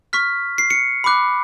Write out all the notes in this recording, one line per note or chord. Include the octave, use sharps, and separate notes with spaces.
C#6 F6 B6
C7
C#7
B5 D6 F#6